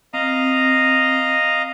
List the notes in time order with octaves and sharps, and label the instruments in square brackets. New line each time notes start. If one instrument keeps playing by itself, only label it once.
[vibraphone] C4 [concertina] D#5 F5 A#5